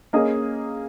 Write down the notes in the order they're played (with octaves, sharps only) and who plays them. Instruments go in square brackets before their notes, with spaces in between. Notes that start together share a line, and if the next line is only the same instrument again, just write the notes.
[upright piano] A#3 C#4 G#4 D#5